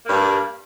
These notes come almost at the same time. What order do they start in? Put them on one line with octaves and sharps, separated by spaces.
A#3 G2 G3